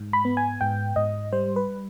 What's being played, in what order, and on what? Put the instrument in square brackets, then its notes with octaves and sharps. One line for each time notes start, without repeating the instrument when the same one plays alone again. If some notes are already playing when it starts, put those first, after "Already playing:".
Already playing: [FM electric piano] G#2
B5
B3
G#5
G#2 G5
G#2 D#5
G3 C5
B4